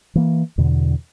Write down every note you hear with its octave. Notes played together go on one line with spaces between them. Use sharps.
E3 A#3
E2 B2 D3